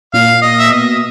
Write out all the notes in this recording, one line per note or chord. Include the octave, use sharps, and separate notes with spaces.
A#2 F5
D#5
E5
B2 D#5